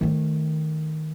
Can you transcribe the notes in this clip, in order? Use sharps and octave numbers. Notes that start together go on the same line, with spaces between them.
D#3 A3